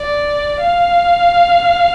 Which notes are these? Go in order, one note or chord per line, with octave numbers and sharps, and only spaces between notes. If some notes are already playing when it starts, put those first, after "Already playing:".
Already playing: D5
F5